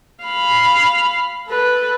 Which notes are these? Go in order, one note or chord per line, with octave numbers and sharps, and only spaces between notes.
F5 B5
A4 B4